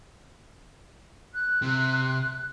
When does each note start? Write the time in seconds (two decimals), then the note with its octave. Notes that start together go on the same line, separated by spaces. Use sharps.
1.34 F#6
1.62 C3